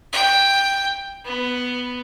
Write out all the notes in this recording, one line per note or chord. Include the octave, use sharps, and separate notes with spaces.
G5
B3